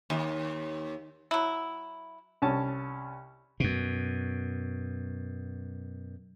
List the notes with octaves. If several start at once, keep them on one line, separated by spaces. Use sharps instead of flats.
D#2
F#3 E4
C2 C#4 A5
F#2 B2